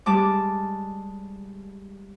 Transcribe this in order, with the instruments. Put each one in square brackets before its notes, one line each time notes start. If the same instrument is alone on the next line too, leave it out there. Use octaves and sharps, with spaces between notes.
[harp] G3 G#3 A5 D6